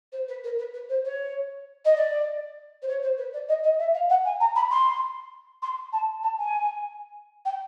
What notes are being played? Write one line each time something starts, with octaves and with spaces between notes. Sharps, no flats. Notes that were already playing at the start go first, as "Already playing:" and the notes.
C5
B4
A#4
B4
B4
C5
C#5
D#5
D5
C5
C#5
C5
B4
D5
D#5
D#5
E5
F5
F#5
G#5
A#5
B5
C6
C6
A5
A5
G#5
G5